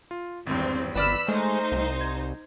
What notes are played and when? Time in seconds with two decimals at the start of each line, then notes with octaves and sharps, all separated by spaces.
0.11 F4
0.47 G#1 E2 G2 C4
0.95 G1 B4 D5 B5 E6 F6
1.28 G#3 A3 D#4 C5
1.72 C2
2.01 G#6